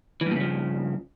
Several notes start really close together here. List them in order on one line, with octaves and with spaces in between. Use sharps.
E3 G2 A#2 C#3 F3